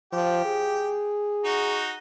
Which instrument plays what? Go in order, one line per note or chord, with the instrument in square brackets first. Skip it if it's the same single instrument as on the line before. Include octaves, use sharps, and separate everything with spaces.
[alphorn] F3 [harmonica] G4
[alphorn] G#4
[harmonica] D#4 F#4